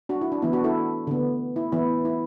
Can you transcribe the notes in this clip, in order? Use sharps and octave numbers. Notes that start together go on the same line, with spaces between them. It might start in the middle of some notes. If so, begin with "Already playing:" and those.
D4 F#4
E4
D4
E3 B3 E4
D4 F#4
E4 A4
D3 B3
E4
E3 B3 E4
E4